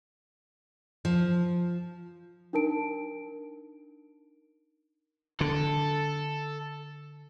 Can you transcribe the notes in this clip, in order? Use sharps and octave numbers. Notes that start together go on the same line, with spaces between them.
F3
D4 D#4 A#4 A5 D7
D3 A4